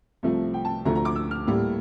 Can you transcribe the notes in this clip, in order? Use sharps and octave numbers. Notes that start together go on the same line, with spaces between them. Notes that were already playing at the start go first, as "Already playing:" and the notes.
C2 C3 F3 A3
G5
A5
D2 D3 F3 A3 A#5
A#5
D6
E6
F6
A2 G3 A#3